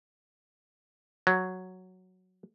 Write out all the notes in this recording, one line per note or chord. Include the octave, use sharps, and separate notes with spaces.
F#3